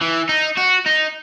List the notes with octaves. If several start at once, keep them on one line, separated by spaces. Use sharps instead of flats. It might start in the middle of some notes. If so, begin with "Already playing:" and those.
E3
D#4
F#4
D#4